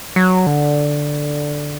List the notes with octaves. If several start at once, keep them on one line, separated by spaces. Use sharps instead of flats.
F#3
D3